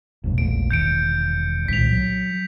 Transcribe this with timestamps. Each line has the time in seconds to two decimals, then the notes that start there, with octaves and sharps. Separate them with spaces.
0.24 G1 F2 B2
0.38 E1 A#1 A3 D7
0.71 E1 D#3 G6 C#7 D7
1.68 C2 A#2 D#3 B6 F7
1.92 F#3